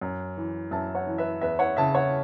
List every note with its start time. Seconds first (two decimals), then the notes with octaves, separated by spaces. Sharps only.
0.01 F#2
0.37 E3
0.71 F#2 E5 A5
0.95 C#5 F#5
1.07 E3
1.18 B4 E5
1.41 E2 B4 E5
1.59 C#5 F#5
1.77 C#3 E5 A5
1.95 C#5 F#5